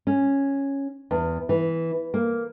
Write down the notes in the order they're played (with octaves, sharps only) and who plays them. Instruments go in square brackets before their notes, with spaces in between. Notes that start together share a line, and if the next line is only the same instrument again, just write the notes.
[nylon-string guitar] C#4
E2
E3
A#3